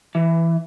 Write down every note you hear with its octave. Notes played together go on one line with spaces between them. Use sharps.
E3